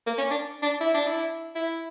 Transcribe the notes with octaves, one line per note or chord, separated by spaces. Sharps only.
A#3
C#4
D4
D4
E4
D4
E4
E4